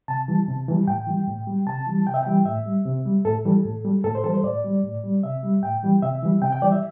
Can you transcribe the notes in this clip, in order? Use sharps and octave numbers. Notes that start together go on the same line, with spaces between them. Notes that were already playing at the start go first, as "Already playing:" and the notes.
C3 A5
E3 G3
C3
E3 G3
A2 G5
E3 G3
A2
G3
C3 A5
E3 G3
C3 G5
E5
E3 G3 G5
A2 E5
G3
C3
G3
A2 A4
E3 G3
A2
G3
A2 A4
C5
E3 G3 A4
C5
A2 D5
G3
A2
G3
C3 E5
G3
A2 G5
E3 G3
C3 E5
E3 G3
C3 G5
G5
E3 G3 D5
E5